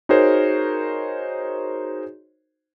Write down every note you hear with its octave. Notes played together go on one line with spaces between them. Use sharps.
D#4 F#4 G#4 A#4 C5 C#5